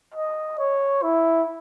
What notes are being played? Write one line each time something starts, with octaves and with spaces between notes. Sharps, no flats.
D#5
C#5
E4